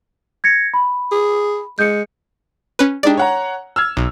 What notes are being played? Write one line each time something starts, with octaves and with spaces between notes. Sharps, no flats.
G#6 A#6 C#7
B5
G#4
G#3 G6 C#7
C#4 B4
G#3 D4 D#4 G4 D5
C#5 F#5 A#5
E6 F6 G#6
B1